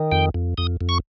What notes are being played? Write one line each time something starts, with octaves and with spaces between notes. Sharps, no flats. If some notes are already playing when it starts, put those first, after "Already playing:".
Already playing: D#3
F2 G5
F2
F2 D#6
F2
C#6